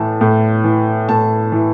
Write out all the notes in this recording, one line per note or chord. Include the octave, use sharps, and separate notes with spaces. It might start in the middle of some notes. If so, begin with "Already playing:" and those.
Already playing: A2 E3 A5
A2
E3
A2 A5
E3